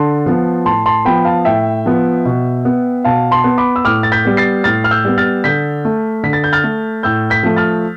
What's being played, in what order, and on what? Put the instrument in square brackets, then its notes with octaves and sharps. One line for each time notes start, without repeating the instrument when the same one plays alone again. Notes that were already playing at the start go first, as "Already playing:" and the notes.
Already playing: [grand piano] D3 A5 C6
F3 B3
A2 A5 C6
A5 C6
F3 B3 G5 B5
F5 A5
A2 E5 G5
F3 B3
B2
B3
B2 F5 A5
A5 C6
B3
B5 D6
E6
A2 D6 F6
A6
G6 B6
G3 B3
A6 C7
A2 F6 A6
F6
E6 G6
G3 B3
F6 A6
D3 G6 B6
A3
D3 B6
A6
G6
F6 A6
A3
A2 E6 G6
G6 B6
F3 A3
F6 A6